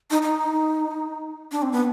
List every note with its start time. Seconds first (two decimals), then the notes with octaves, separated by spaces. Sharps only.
0.10 D#4
0.22 D#4
1.51 D4
1.62 C4
1.72 B3